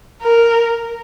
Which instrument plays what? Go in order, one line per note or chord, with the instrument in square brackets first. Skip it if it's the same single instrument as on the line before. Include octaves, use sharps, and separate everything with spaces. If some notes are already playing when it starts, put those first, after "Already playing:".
[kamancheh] A#4